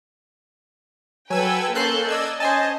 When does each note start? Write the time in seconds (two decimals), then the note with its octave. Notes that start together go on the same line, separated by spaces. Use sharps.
1.30 F#3 A4 B4 G5 G#5 E6 G#6
1.75 A#3 C#4 A4 A5 C6 F#6 G6
2.08 D5 D#5 E6 G#6
2.40 C#4 C5 D#5 G#5 A5